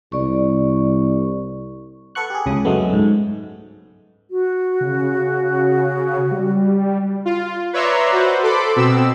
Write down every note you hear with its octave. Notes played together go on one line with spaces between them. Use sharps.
C2 D5 C#6
A4 B4 F#5 C#6 F#6
G4 G#4
C#2 C#3 D#6
F#2 F#3 G#3 A3 B3
G#2
F#4
C#3
G3
F4
B4 C#5 D5 E5 A#5 C6
F#4 B4 C5
A4 B5 C6 D6
B2 C4 E6